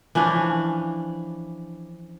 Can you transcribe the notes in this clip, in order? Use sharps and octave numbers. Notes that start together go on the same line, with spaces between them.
E3 F3 C#4 D4